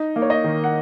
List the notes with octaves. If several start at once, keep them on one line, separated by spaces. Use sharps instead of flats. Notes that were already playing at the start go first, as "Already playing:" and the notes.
Already playing: D#4 D#5
A#3
C#5
D#5
D#3
F#5